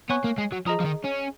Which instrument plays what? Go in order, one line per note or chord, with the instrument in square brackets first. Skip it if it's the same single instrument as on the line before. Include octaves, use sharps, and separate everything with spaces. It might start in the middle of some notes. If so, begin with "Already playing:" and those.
[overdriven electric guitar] B3 [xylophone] C#5 G#5 C#6 F#6
[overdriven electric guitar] A#3
G#3
F#3
[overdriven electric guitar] F3 [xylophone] G#4 D#5 A#5 D#6
[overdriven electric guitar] F3
D#3
C#4